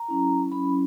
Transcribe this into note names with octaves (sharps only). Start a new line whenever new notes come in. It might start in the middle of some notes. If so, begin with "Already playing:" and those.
Already playing: A#5
F#3 C#4 E4
F#3 C#4 E4 B5